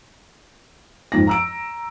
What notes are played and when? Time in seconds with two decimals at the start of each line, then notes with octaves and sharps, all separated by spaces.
1.12 F2 G#2 A#6
1.27 A#5 E6 D7